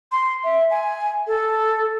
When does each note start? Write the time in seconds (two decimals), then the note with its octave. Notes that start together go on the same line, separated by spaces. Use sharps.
0.12 C6
0.44 E5
0.70 G#5
1.27 A4